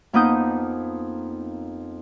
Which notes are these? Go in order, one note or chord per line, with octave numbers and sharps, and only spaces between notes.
F2 A#3 B3 D#4 D#6 G6